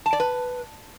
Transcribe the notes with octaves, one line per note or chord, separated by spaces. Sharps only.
A5
D5
B4